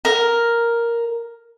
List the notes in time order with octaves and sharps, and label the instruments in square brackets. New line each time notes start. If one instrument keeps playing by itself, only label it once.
[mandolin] A#4